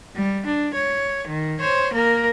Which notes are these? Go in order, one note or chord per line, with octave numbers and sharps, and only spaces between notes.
G3
D4
C#5
D#3
C5 C#5
A#3 A#4